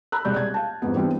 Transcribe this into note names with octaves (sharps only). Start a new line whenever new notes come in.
A#5 B5 E6 F#6
E1 C2 G3 D5 G6
G#6
F5 A5
F2 G#2 B3
E3 G3 B3 C4 D4